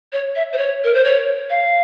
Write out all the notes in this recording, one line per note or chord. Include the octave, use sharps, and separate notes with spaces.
C#5
E5
C5
C#5
A#4
C5
C#5
F5